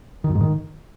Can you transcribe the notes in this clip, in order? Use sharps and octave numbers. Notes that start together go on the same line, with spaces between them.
D#3
F#2
G#2
D#3